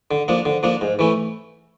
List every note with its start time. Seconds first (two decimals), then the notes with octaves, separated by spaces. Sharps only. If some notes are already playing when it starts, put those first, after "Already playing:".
0.11 D3
0.28 F3 A#3 D4
0.45 D3
0.63 F3 A#3 D4
0.81 G#2
0.99 E3 A3 C#4